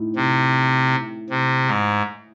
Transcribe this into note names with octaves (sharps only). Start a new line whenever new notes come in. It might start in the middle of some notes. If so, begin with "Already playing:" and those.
Already playing: A2 D#4
C3
C3
G#2